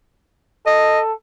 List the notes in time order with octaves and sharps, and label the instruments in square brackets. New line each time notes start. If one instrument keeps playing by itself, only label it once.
[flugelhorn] A4 [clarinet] D#5